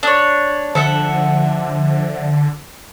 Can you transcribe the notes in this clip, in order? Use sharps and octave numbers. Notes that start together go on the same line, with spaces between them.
D4 C#5
D3 F3 A4 E5 F#5